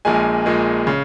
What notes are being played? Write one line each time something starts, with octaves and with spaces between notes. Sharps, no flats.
A#1 A#2 G#3 G#5
A#1 A#2 G#3
C#3